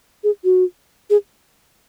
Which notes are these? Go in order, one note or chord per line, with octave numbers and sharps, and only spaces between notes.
G#4
F#4
G#4